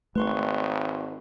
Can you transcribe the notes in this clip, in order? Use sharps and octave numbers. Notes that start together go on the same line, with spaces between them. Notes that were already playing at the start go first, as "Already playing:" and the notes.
G#1 A3 B4 C6 C#6